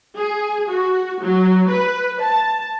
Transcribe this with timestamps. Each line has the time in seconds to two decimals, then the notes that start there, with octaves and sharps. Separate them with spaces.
0.17 G#4
0.69 F#4
1.23 F#3
1.70 B4
2.21 A5